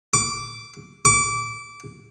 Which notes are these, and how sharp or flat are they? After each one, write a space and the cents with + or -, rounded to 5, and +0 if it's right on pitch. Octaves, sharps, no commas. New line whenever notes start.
D6 -10
D6 -20